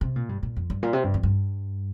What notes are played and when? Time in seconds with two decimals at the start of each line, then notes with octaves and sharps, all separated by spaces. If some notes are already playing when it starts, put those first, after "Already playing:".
0.01 C3
0.16 A#2
0.29 G2
0.43 A#2
0.56 F2
0.70 G2
0.83 A#2
0.93 C3
1.04 G2
1.14 F2
1.23 G2